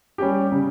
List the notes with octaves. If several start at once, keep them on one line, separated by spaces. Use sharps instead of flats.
G3 C#4 G4
C#3